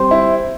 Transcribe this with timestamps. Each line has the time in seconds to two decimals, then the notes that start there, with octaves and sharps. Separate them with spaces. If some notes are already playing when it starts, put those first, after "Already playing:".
Already playing: G3 C4 G4 C5
0.11 E4